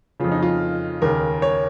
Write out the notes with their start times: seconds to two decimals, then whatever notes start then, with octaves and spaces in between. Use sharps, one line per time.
0.20 F2 C#3 F4
0.32 D#4
0.42 F4
1.02 D#2 C#3 A#4
1.42 C#5